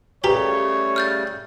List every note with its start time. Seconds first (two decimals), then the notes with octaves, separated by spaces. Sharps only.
0.24 C#3 G3 A3 G4 B4 C#5 A#5
0.96 F6 G6 A6